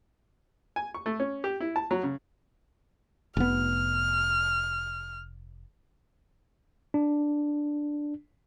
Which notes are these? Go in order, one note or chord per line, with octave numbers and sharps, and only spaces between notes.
G#5
C#6
A3
C#4
G4
E4
A5
F#3
C#3
F1 B3 F6
D4